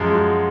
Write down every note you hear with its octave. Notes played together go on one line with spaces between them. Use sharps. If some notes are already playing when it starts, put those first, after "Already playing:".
Already playing: F#2 F3 G#3 G#4
F#4